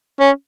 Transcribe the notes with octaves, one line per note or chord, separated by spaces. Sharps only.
C#4